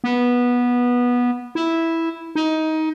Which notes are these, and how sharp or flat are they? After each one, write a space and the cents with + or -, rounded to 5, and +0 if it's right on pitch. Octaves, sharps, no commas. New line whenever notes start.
B3 -15
E4 -5
D#4 +20